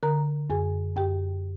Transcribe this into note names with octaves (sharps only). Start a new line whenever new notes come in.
D3 A#4 A#5
F#2 G#4 G#5
F#2 G4 G5